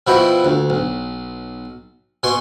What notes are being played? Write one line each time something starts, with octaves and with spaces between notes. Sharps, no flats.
B2 F3 E4 F#4 G5 B5
D2
B1
B2 G#5 C6 C#6